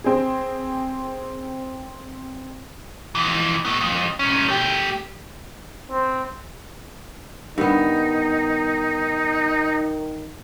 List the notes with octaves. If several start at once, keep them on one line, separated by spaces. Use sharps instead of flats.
C4 G#4
F2 E3
A3 B3
F2
C2 C#4
A3 G4
C4
G2 D#3 B3 D#4